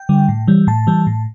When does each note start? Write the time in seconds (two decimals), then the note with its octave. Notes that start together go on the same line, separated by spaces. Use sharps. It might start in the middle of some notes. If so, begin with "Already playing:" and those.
Already playing: G5
0.09 D3 G3
0.29 A2
0.48 E3 G3
0.67 A2 A5
0.87 E3 G3
1.07 A2